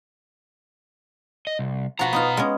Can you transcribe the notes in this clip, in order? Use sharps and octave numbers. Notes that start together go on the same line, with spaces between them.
D#5
C2
B2 F3 F#4 A#5 B5
B3 D#4 F4
G#3 B3 C#4